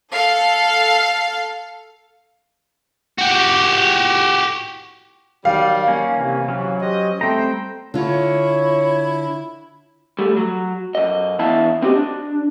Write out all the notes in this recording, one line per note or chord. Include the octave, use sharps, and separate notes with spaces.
A4 F5
F#4 G4
D#3 F#3 G3 F5
A#3 C#4
C3 E3
F#3 C#4
G4 C5 D#5
G3 A3 C4 G5 A#5
D3 E4 F4 C#5
G3 A3
F#3
F#2 D#5
E2 B3 E4 E5 F5 A5
C4 F#4 G4 B4 D#5
D4